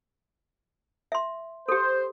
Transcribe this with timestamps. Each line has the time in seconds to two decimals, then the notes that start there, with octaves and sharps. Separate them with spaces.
1.12 E5 C6
1.69 G4 A4 C5